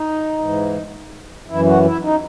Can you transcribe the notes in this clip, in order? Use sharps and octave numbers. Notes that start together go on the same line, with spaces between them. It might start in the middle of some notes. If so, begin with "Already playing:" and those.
Already playing: D#4
G#2 E3
F#2 E3 E4
F#4
E4
D#4